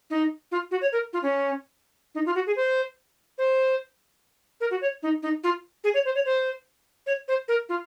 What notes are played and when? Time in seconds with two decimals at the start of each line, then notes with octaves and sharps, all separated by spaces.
0.10 D#4
0.52 F4
0.71 F#4
0.81 C#5
0.92 A#4
1.13 F4
1.23 C#4
2.15 D#4
2.26 F4
2.35 F#4
2.47 G#4
2.56 C5
3.38 C5
4.61 A#4
4.71 F#4
4.81 C#5
5.03 D#4
5.23 D#4
5.44 F4
5.84 G#4
5.94 C#5
6.05 C5
6.15 C#5
6.25 C5
7.06 C#5
7.28 C5
7.48 A#4
7.69 F4